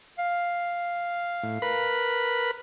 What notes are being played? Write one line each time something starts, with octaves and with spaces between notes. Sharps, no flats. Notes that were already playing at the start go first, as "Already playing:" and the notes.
F5
A2
A#4 B4 B5